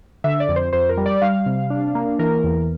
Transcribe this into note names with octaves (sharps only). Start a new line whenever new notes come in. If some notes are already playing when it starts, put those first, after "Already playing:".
D3 E5
D5
F2
C5
F2 C5
A#4
G3
D5
G3 F5
C3
D4
A#3
E3 A#4
E2